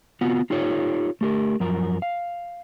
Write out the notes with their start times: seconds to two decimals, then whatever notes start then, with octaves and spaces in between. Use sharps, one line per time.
0.21 B3 C4 F4 F#4 F#5
0.50 D#4 F4 G4 A4 C#5
1.21 A3 G4 A#4
1.60 F#2 F3 A#4
2.02 F5